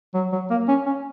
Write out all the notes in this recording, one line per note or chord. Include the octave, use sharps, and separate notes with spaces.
F#3
F#3
A#3
C#4
C#4